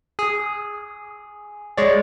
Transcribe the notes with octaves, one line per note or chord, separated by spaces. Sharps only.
G#4
G#3 C#5 D5